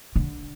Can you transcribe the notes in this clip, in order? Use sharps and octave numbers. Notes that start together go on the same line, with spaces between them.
D3